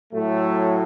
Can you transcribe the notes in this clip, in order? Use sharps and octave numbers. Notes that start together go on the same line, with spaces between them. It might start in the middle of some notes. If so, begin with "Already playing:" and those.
A2 F#3 A3